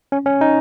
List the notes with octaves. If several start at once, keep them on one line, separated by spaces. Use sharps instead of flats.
C#4
C#4
D#4